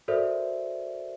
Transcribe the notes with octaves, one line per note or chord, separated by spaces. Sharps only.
F#4 A4 A#4 C5 D5 E5